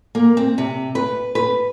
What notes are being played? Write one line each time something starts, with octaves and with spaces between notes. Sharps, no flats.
A#3
C4
C3
B4
B4